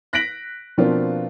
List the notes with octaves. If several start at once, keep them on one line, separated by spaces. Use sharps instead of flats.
F#6 A#6 B6 D7 F#7
B2 F3 A#3 C4 D4 F4